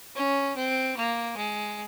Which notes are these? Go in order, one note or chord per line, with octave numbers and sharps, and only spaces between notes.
C#4
C4
A#3
G#3